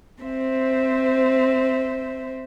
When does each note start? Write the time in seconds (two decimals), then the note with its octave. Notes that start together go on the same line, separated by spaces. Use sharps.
0.22 C4 C5 E5